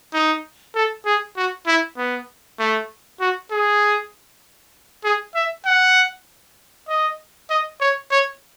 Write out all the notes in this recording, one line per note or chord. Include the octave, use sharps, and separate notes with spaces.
D#4
A4
G#4
F#4
E4
B3
A3
F#4
G#4
G#4
E5
F#5
D#5
D#5
C#5
C#5